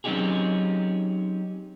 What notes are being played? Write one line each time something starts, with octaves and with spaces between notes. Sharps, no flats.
F#3 C4 C#4 D#4 G4 G#4